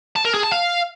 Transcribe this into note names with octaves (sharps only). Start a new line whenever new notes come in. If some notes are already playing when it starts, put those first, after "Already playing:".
A5
A#4
G#4
A5
F5